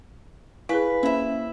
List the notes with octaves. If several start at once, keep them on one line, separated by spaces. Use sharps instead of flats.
E4 G#4 B4 F5 G#5 B6
A#3 C#4 E4 C5 E5 B5